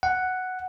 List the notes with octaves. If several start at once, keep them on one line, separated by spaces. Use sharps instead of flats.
F#5